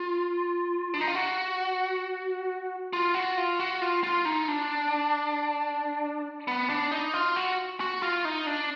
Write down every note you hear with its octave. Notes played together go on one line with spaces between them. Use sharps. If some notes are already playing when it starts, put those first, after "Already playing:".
Already playing: F4
D4
D#4
F4
F#4
F4
F#4
F4
F#4
F4
F4
D#4
D4
B3
D4
D#4
F4
F#4
F#4
F4
D#4
D4